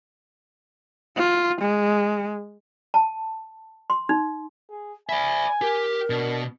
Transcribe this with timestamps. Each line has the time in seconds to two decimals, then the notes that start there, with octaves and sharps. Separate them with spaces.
1.17 F4
1.61 G#3
2.94 A5
3.90 C6
4.09 D#4
4.70 G#4
5.09 D5 E5 G#5 B5
5.62 G4 A#4
6.10 B2 D4